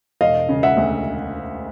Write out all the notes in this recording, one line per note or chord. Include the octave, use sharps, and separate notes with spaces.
E1 D#5 F5
C#3
E5 F#5
D2